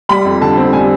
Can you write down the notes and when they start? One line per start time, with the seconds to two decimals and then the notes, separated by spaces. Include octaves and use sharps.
0.09 G3 B5
0.25 F2
0.41 D3 A5
0.57 C4
0.73 G3 G#5